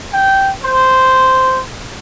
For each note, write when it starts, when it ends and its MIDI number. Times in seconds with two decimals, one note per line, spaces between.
0.12 0.49 79
0.63 1.59 72